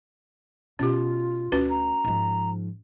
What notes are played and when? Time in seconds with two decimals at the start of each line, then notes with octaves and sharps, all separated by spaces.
0.79 B2 C#4 F4 G4
1.52 D2 C#4 F#4 B4
1.70 A#5
2.04 G#2 F3